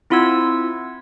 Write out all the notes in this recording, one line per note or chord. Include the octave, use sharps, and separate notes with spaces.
C4 E4 F4 F#5 E6 G#6